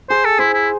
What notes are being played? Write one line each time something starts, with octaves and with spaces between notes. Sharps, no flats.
G#4 C5
A4
E4 C5
E4